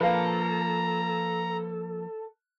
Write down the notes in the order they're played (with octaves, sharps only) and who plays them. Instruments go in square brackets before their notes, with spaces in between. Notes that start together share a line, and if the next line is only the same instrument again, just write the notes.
[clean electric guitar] F3 A#3 [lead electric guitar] A4 [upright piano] B4 F5 [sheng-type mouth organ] A#5